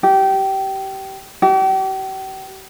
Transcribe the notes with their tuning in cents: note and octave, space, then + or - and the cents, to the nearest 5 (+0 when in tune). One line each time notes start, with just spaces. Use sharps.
G4 -20
G4 -40